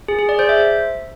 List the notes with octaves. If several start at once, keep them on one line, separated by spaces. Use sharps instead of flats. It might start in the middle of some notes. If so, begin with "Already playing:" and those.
G#4
G#4
D5
C5
E5